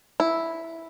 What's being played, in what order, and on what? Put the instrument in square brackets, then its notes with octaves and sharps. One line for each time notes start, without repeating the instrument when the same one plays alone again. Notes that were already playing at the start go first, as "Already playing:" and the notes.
[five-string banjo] E4